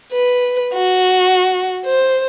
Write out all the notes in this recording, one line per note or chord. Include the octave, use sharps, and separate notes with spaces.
B4
F#4
C5